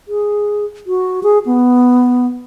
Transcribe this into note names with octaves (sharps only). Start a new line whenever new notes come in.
G#4
F#4
G#4
B3